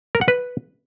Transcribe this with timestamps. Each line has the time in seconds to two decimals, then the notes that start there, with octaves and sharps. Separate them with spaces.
0.15 A#4
0.21 F#5
0.28 B4